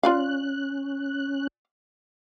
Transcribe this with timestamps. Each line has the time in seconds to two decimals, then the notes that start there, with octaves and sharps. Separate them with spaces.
0.03 C#4 F4 D5 F5 F#6